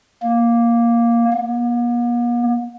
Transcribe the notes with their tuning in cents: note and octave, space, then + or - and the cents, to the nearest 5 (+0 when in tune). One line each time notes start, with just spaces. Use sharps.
A#3 +5
A#3 +45